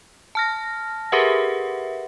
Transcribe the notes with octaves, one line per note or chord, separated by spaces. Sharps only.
A5 F6 A#6
G4 G#4 A#4 B4 E5 F#5